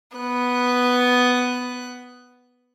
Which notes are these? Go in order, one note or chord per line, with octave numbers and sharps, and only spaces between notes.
B3 F#6